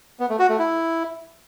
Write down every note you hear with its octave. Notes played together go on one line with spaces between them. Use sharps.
B3
A3
F#4
A3
E4